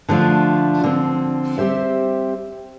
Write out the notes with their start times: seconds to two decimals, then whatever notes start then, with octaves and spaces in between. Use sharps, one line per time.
0.09 D3 F3 A3 D4 F4
0.83 D3 F3 C4
1.58 G3 C4 G4 C5 E5